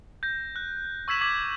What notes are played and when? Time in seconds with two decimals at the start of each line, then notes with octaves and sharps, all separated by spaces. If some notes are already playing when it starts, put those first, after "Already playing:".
0.23 G6 A#6
0.56 F#6
1.08 C#6 E6 G#6 B6 E7 F#7
1.21 D6 G#6 B6